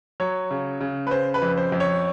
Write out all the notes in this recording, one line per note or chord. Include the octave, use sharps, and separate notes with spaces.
F#3 C#5
C#3
C#3
B4
C#3 C5
B4
F2
C5
F2
C#5